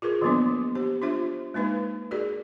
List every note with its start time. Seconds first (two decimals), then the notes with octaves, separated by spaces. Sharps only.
0.02 F4 G#4 A#4 B4
0.21 D#3 F3 F#3 A#3 B3 D4
0.75 G4 C5
1.02 D4 F4 C5 E5
1.54 G#3 A#3 D#4 B4
2.11 F#4 G#4 A#4 D5